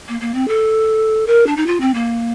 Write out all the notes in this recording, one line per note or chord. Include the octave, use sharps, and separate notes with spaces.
A#3
A#3
C4
A4
A#4
D4
D#4
F4
C4
A#3